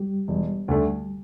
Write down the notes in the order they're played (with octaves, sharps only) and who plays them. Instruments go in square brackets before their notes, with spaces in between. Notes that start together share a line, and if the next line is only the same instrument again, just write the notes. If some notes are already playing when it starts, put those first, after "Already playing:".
Already playing: [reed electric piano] G3 G4
[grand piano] E1
D2 D3 A3